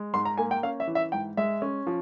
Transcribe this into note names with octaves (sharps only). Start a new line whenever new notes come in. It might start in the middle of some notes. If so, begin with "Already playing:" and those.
Already playing: G#3
G#2 C6
A#5
A#3 G#5
G5
C#4 F5
E5
E3
E5
G#2 G5
G#3 E5
C#4
F3